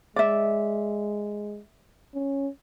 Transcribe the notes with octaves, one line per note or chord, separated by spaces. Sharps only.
G#3 D5 E5
C#4